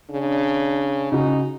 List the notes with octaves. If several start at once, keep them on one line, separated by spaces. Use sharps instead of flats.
C#3 D4
C#3 D#4 F#4